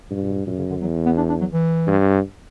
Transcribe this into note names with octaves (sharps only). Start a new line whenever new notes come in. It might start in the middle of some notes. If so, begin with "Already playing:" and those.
G2 A#2
A#2
B2
A#2
F#2 A#2
C#3
D3
E2 F#3
B3
D4
D4
F#3
E3
G2